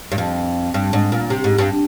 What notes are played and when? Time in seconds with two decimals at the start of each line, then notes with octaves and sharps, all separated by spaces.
0.12 G2
0.18 F2
0.74 G2
0.93 G#2
1.12 A#2
1.30 C3
1.44 G#2
1.58 G2